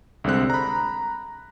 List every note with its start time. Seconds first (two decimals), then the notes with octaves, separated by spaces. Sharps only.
0.24 C2 D3 G#3 C4 F#6
0.50 A#5 B5